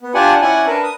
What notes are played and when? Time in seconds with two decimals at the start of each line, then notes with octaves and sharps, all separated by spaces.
0.02 B3
0.15 D4 F4 G4 D5 F#5 G#5
0.41 C#4 E4 D5 F#5 G#5
0.66 D4 A#4 B4
0.83 D#6